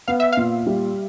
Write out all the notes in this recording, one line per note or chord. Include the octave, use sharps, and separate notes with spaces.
B3 F5
E5
A#2 F5
G3